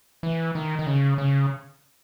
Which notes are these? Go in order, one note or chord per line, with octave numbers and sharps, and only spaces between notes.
E3
D#3
D#3
C#3
C#3